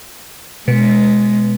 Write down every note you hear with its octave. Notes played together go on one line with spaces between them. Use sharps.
B2 G#3